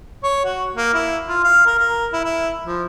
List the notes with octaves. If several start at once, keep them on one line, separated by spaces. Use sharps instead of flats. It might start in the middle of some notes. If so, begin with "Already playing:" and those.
C#5
F#4
A#3
E4
F4
F5
A#4
A#4
E4
E4
F3